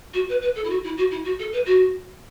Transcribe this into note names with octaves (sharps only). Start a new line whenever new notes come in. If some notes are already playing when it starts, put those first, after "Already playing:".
F#4
B4
B4
A4
E4
F#4
E4
F#4
E4
F#4
A4
B4
F#4